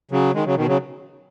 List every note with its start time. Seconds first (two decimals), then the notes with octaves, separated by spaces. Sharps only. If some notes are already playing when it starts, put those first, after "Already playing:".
0.11 C#3 F#3
0.34 D#3 G#3
0.45 C#3 F#3
0.56 B2 D#3
0.67 C#3 F#3